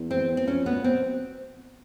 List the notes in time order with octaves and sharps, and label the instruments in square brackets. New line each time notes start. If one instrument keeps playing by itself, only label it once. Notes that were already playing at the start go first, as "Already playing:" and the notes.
Already playing: [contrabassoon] E2
[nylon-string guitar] C4
[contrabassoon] E2 [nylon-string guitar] C4
[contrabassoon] F2 [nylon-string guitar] C#4
[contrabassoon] A#2 [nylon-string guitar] B3
[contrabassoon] B2 [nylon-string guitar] C4